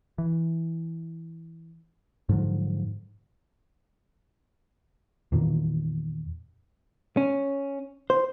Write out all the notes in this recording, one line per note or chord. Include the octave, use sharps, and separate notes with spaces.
E3
G#2 D3 F3 F#3
E2 A#2 D#3
C#4
C5